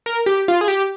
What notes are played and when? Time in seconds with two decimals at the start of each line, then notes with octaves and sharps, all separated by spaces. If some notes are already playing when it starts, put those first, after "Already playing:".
0.06 A#4
0.26 G4
0.48 F4
0.61 G#4
0.68 G4